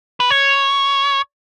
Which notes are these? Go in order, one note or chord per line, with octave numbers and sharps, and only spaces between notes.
B4
C#5